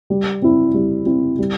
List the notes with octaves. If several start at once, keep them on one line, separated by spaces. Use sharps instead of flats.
G3
C4 E4
G3
C4 E4
G3